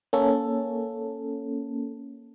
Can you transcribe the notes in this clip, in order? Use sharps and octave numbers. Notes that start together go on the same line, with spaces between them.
A#3 C#4 A4